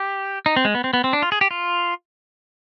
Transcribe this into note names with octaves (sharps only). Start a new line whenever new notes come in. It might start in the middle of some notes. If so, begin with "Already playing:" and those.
Already playing: G4
D#4
C4
G#3
B3
C4
B3
C4
D4
F4
G#4
G4
F4